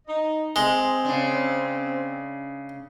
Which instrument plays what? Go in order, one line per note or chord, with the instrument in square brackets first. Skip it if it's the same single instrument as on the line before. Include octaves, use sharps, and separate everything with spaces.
[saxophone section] D#4 D#5
[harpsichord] G#3 [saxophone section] C4
[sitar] C#3 D4